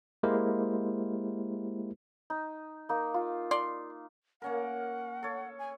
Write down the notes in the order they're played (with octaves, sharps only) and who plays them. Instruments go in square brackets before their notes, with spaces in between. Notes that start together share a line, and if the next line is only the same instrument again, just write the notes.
[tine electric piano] G#3 A#3 E4 G4 A#4 C5
[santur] D#4
A#3 D#4
F4
[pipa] D5 C6
[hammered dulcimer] A#3 C#4 A#4 [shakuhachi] F#5
[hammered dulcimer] A4 C#5
[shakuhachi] G#5